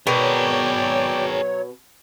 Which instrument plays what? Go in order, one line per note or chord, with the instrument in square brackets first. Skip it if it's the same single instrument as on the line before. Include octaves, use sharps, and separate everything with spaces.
[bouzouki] B2 [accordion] F#3 C#5 [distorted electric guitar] G#4 A#4 [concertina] D5 G5